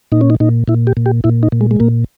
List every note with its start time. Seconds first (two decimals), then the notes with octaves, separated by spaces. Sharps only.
0.12 A#2 D#4
0.21 C#4
0.30 D#4
0.40 A#2 D#4
0.68 A#2 E4
0.87 G4
0.97 A#2
1.06 G4
1.24 A#2 E4
1.43 D#4
1.52 A#2
1.61 G#3
1.71 G#3
1.80 A#2 A#3